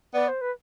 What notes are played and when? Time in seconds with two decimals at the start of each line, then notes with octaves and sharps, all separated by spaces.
0.14 B3 D5
0.28 C5
0.41 B4